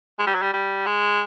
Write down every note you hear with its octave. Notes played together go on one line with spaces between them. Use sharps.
G#3
G3
F#3
G3
G3
G#3